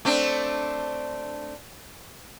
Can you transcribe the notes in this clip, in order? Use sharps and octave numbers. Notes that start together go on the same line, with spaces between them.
A3 C4 D4